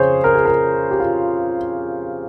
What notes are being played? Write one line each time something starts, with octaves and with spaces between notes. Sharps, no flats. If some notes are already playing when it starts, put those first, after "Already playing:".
Already playing: F2 C#3 G#4 C5 C#5
A#4
G#4
A#4
G4
F4